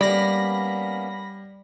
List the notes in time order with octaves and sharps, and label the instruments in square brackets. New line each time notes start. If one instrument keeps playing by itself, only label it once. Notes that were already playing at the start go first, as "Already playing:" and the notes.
[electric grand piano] G3 [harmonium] A#3 B3 C#4 [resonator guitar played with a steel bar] D5 [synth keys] B5 A#6